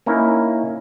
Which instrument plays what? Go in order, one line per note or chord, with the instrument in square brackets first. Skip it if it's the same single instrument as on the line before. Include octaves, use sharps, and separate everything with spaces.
[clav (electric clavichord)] A#3 C#4 D#4 E4